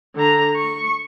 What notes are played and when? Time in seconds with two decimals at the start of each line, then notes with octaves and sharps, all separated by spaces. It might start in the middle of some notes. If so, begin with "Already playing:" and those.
0.16 D3 A#5
0.57 C#6